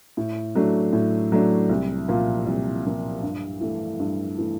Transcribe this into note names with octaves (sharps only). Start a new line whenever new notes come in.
A2
F#3 A3 D4
A2
F#3 A3 D4
C2
A#2 F3 A#3
C2
A#2 F3 A#3
G2
E3 A3
G2
E3 A3